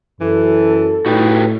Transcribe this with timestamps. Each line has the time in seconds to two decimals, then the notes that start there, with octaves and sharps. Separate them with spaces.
0.21 F#2 E3 A4
1.06 A2 D#4 F#4 G4 B4